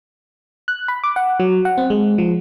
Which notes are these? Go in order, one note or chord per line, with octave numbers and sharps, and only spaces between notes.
F#6
B5
D6
F#5
F#3
F#5
C4
G#3
F3